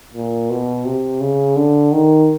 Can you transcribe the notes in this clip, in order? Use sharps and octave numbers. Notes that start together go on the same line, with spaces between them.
A#2
B2
C3
C#3
D3
D#3